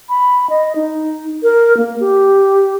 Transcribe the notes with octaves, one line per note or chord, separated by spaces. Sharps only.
B5
D#5
D#4
A#4
A#3
G4